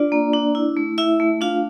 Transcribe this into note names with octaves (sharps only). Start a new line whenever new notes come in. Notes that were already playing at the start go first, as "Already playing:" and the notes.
Already playing: D4 F4 D5
A#3
D4
E4
A3
E4 E5
A3
D4 F4 F5